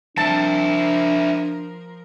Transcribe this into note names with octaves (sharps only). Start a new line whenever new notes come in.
F3 C4 D4 E4 A#4 A5